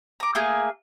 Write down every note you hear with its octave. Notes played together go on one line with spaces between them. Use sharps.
A#5 D6
A3 A#3 G#4